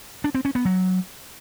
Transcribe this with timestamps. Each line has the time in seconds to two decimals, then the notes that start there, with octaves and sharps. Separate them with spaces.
0.24 D4
0.34 C4
0.45 C#4
0.55 B3
0.65 F#3